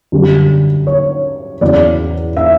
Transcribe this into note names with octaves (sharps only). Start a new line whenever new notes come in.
F#2 D3 G3
C#5
E2 C#3 F#3 D5
E5